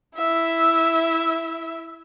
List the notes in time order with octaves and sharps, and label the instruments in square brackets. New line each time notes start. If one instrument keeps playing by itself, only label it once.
[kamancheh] E4 E5